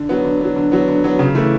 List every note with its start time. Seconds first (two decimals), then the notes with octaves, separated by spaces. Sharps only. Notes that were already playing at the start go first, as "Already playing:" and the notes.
Already playing: D3
0.09 F#3 B3
0.25 D3
0.41 F#3 B3
0.56 D3
0.72 F#3 B3
0.88 D3
1.04 F#3 B3
1.19 C#3
1.35 E3 A3